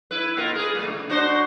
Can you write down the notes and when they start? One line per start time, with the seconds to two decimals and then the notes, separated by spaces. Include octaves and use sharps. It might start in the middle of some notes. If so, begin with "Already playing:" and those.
0.11 E4 B4
0.37 A#2 F4 A#4
0.55 G#4 B4
0.75 A2 A3
0.87 C#3
1.09 D4 F#4 C5